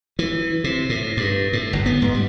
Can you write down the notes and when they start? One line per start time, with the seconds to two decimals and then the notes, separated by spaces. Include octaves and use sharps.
0.19 E3
0.64 C3
0.90 A2
1.17 G2
1.53 A2
1.73 G1
1.86 B3
2.02 G#2
2.14 G3